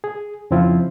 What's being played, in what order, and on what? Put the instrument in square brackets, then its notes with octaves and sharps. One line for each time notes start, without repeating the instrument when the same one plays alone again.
[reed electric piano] G#4
F2 C#3 F3 C4 E4 F4